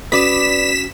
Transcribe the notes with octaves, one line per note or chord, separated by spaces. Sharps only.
C#4 F#4 B4 D5 D#6 B6 E7